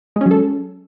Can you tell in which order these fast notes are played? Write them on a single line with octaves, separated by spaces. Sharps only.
G#3 C#4 F#3 A4